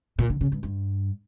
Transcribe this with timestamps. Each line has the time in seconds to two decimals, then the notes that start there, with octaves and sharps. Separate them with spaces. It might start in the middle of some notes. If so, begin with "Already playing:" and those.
0.19 A#2
0.30 D3
0.41 C#3
0.52 G2
0.63 G2